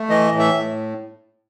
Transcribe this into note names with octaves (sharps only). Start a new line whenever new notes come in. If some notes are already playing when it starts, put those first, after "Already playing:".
Already playing: A3
E3 D#5
A2
E5
A2